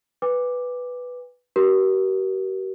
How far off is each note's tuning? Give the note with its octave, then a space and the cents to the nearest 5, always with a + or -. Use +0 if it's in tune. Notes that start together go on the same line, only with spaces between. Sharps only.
B4 +0 G#5 -45 D6 +0
G4 -45 A#4 +30